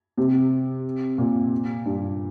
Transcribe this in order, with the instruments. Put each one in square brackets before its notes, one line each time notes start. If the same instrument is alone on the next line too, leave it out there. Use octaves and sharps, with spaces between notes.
[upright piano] C3
A#2
G2